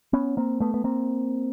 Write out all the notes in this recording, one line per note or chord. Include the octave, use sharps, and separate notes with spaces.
B3 C#4
A#3 C4
A3 B3
B3
A#3 C4